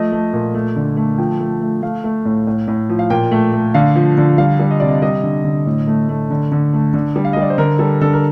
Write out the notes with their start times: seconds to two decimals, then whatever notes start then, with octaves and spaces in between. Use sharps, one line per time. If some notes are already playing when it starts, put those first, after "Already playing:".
Already playing: F3 A3 D#5
0.12 A3
0.33 A#2
0.54 A3
0.76 D3
0.97 A3
1.18 F3 G5
1.40 A3
1.61 A3
1.82 A3 F5
2.04 A3
2.25 A2
2.47 A2
2.68 A2
2.89 F3
2.99 F5
3.10 A#2 G5
3.31 A3
3.53 A3
3.74 D3 F5
3.96 F3
4.18 D3
4.38 G3 F5
4.59 G3
4.71 D#5
4.80 C3 D5
4.89 D#5
5.02 G3 D#5
5.23 D3
5.45 D3
5.66 A2
5.87 A3
6.09 A3
6.30 D3
6.52 D3
6.73 A3
6.94 D3
7.16 G3
7.25 F5
7.33 D#5
7.37 G3 D5
7.50 C5
7.58 D3 A#4
7.79 G3 A4
8.01 D3 A4
8.13 A#4